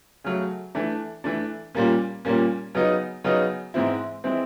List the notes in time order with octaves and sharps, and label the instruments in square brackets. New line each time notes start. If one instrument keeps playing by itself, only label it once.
[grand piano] C#3 F#3 A3
E3 A3 D4
E3 A3 D4
A#2 G3 A#3 C#4
A#2 G3 A#3 C#4
C#3 F#3 B3 D#4
C#3 F#3 B3 D#4
G#2 E3 G#3 C4 E4
E3 G#3 C4 E4